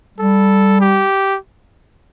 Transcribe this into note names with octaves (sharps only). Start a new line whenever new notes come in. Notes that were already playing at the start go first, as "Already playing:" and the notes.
G3 A4
G4